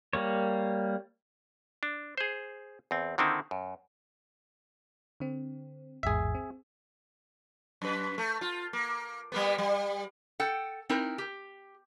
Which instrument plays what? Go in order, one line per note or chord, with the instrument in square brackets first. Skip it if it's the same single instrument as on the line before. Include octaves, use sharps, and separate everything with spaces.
[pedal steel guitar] G3 A#3 C#5
[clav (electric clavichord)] D4
G#4 C5
E2 C4
D3 D#3 C4 D#4 E4
F#2
[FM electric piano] D3 C4
[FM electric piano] A1 E2 G#2 [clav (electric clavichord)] G#4 E5
[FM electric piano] C4
[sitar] F#2 B4
A3
F4
A#3
G3 A#3 B3
G3
[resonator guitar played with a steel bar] A4 F#5 G5
C4 D#4 E4 A#4
G4